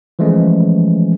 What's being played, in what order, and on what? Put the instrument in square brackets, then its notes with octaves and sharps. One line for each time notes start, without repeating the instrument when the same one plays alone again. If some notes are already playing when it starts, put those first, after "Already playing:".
[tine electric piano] E3 F3 G#3 A3 C#4